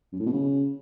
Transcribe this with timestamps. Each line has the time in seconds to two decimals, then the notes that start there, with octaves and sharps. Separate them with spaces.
0.13 F#2
0.19 A2
0.26 B2
0.33 C#3